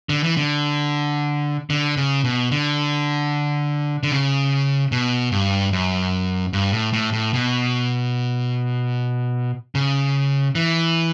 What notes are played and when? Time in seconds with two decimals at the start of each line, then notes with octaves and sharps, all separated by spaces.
0.09 D3
0.24 E3
0.37 D3
1.70 D3
1.97 C#3
2.24 B2
2.51 D3
4.03 D3
4.12 C#3
4.92 B2
5.32 G2
5.73 F#2
6.53 G2
6.73 A2
6.93 A2
7.13 A2
7.33 B2
9.75 C#3
10.55 E3